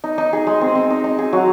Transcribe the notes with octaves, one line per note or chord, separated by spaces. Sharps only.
D#4
D#4
G#4
G#3
C4
C4
D#4
D#4
G#4
F#3